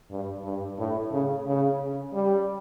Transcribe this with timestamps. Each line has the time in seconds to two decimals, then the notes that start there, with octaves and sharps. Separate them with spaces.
0.11 G2
0.44 G2
0.79 A2
1.12 C#3
1.46 C#3
2.13 G3